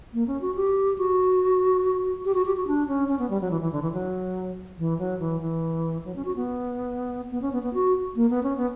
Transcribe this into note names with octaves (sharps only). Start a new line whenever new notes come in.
A#3
C#4
F#4
G4
F#4
G4
F#4
G4
F#4
D4
C#4
C#4
B3
G3
F#3
E3
E3
D3
E3
F#3
E3
F#3
E3
E3
F#3
C#4
F#4
B3
B3
C#4
B3
B3
F#4
A#3
B3
C#4
B3